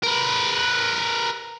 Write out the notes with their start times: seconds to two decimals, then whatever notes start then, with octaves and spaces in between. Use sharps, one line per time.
0.04 A#4 B4